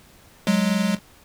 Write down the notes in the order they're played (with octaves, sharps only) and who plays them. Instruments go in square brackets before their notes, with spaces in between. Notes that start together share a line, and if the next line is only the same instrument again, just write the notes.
[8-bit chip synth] F#3 G#3